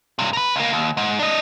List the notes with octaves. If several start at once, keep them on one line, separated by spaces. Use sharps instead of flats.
G2 C3
A#4 B4
C#2 A#3
D#2
G#2
D4 D#5